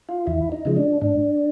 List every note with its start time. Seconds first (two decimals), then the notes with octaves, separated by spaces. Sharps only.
0.09 F4
0.27 E2 E4
0.52 D#4
0.65 C#3 F3 G#3
0.76 D4
1.01 G#2 D4